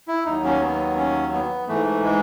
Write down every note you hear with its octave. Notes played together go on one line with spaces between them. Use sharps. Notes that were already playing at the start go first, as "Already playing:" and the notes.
E4
D#2 D#3 F#3 D#4
C#4
B3
C#4
B3
G#2 E3 A3
A3
G#3